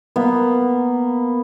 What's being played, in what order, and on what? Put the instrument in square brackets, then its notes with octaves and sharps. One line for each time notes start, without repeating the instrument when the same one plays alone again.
[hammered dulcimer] A#3 B3